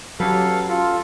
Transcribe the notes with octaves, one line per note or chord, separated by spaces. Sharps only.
F#3 C#4 G4 A4 B4 F5
C#4 F4 A4